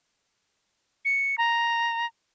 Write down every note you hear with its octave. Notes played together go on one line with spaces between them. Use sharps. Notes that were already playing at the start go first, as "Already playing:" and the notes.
C#7
A#5